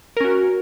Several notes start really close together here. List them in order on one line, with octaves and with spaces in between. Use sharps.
A#4 C#4 F#4